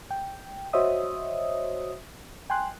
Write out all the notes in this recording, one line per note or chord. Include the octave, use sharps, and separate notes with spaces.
G5
F#4 C5 C#5 D#5 E5 D#6
G5 G#5 C6 F#6